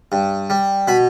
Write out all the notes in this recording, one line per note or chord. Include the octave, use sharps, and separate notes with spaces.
G2
G3
B2 B5